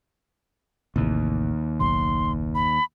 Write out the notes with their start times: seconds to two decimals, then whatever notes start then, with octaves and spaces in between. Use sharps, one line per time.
0.96 A1 D#2 A2 C3
1.80 F#1 B1 C6
2.55 B5